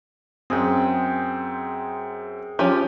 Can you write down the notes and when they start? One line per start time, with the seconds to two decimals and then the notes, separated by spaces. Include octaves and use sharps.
0.50 F#2 C4 G#4 G5
2.59 F3 C#4 G4